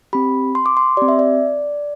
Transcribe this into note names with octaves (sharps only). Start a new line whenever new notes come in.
C4 G4 B5
C6
D6
C6
C4 G4 D5
E5
D5